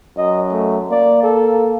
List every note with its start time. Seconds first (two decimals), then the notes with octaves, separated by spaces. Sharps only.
0.18 F#2 D#5
0.52 A3
0.91 A#3 D5
1.23 A4